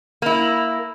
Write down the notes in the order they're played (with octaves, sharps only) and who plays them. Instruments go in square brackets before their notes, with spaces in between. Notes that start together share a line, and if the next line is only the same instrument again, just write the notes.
[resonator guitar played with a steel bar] A#3 E4